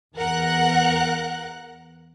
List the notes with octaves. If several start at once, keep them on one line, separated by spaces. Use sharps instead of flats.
E2 A#4 F#5 F#6